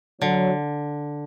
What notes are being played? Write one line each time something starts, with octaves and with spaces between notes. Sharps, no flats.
D3 F#3